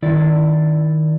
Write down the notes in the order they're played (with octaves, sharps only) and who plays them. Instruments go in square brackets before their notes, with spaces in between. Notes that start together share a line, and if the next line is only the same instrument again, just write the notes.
[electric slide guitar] D#3 E4 D5